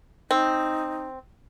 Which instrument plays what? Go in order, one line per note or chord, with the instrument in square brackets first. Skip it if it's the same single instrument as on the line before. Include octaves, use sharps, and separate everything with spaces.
[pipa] C4 [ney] D#4